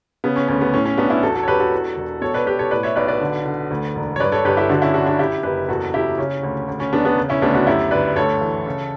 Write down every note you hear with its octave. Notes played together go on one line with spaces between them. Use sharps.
C#3 B3
C#4
D2 C#4
B3
A2 C#4
C#4
B1 B3 D4
C#4 E4
E2 F#4 A4
F#4 A4
C#5
E1 G4 B4
F#4 A4
E2
E1
B2 A4 C#5
B4 D5
B2 G4 B4
A4 C#5
A2 B4 D5
C#5 E5
B1 B4 D5
B4 D5
D3
D3
D2
E1
C#5
G2 B4 D5
A4 C#5
G1 G4 B4
E4 G4
D3 D4 F#4
C#4 E4
D3 D4 F#4
D4 F#4
F#2 E4 G4
F#1 G4 B4
E2 F#4 A4
F#1 E4 G4
C#3 C#4
D2
D2
C#4
E1 B3 D4
B3 D4
C#3
C#4 E4
D2 B3 D4
D4 F#4
F#2 E4 G4
G1 B4 D5
D2 A4 C#5
E3
C#3